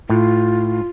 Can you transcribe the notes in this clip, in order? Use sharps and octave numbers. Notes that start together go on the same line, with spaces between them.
A2 F4